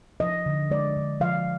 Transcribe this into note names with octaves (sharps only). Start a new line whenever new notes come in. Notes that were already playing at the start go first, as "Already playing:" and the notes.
F3 D#5
D3
G#3 D5
D3
F3 F5